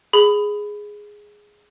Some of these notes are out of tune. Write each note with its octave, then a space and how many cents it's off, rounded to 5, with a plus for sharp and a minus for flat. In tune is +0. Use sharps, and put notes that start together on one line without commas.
G#4 +0 B5 +15